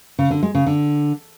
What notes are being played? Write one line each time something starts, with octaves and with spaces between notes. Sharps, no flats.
C#3
D3
G#3
C#3
D3